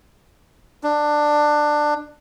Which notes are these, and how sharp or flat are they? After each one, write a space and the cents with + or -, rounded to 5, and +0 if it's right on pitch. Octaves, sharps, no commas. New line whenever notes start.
D4 +15